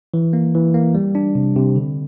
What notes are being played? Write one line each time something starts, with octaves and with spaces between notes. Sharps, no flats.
E3
A#3
E3
A#3
G3
D4
C3
C3
D3